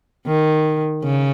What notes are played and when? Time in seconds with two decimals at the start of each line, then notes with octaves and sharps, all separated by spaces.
0.27 D#3
1.03 C#3